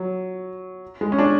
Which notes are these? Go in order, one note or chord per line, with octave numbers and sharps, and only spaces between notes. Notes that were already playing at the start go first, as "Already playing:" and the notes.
Already playing: F#3
G#3
C#4
D4